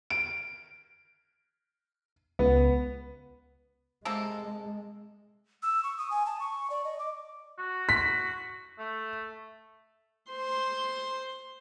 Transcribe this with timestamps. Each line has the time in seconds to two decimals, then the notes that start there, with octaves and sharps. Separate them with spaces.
0.10 D7
2.39 C#2 B3
4.05 C3 G#3 A#3 A4
5.63 E6
5.83 C#6
5.98 D#6
6.11 G#5
6.26 A5
6.40 C#6
6.70 D5
6.84 D#5
6.99 D6
7.58 F#4
7.89 B6
8.79 A3
10.32 C5 C6